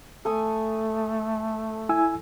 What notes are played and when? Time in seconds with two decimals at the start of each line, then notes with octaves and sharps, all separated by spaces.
0.25 A3 A4 G#5 D#6
1.89 E4 G#5 E6